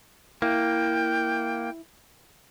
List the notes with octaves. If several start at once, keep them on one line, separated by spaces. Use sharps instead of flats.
A#3 E4 G5